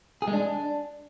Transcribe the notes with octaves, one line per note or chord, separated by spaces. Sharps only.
G#4
G#3
D4